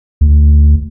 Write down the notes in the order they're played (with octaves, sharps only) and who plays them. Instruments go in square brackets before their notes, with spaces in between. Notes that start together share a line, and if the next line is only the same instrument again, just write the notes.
[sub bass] D2